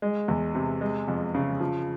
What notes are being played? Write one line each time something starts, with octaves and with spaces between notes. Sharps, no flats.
G#3
E2
C3
G#3
F2
C#3
F3